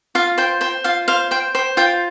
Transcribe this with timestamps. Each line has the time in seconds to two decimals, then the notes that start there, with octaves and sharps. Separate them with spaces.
0.15 F4 F5
0.38 C5 G5
0.61 C5 G5
0.84 F4 F5
1.08 C5 F5
1.31 C5 G5
1.55 C5 G5
1.77 F4 G5